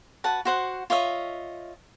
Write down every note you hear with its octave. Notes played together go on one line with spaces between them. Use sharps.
F#4 B4 F#5 A5
F#4 C5 F#5
F4 C#5 D#5 E5